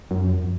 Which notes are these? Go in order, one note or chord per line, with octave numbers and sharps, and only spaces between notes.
F#2
F2